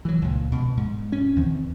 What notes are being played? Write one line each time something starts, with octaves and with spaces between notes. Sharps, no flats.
E3 F#3
C#2 A#2
B2
G#2
C#4
E2 D#3 C4